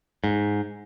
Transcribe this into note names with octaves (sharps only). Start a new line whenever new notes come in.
G#2